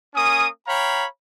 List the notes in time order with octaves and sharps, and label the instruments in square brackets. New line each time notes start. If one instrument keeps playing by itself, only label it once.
[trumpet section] A#3 C#4 G#5 D#6
C#5 F5 G5 A#5 B5